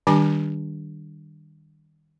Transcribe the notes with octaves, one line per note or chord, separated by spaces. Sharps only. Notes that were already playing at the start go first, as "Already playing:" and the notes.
D#3 G3 D4 G4 G#5 D6